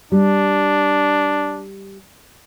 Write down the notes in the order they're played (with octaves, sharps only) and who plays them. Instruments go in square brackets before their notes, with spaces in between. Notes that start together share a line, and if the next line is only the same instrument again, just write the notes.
[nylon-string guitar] G3 [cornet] D4